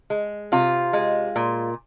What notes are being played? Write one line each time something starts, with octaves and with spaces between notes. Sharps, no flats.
G#3
C3 F4
G#3
A#2